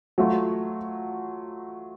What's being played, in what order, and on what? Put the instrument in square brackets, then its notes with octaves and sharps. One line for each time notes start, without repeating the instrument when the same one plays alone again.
[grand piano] F#3 A3 F4